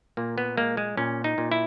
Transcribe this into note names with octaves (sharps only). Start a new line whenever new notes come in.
A#2 A#3
B3
G#3 A#3
G#3
A#2 C#4
D#4
A#2
E4